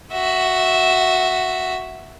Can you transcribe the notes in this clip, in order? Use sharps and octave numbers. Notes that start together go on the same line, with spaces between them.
F#4 E5